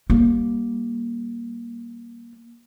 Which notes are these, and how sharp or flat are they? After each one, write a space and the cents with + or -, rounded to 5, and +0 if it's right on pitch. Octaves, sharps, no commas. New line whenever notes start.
G3 +0 A#3 +15